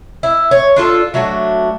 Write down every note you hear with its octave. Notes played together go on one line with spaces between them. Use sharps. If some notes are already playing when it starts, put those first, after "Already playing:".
E4
C#5
D4 F4 A4
F#3 A3 D4 F#4